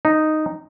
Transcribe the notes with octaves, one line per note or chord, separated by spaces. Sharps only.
D#4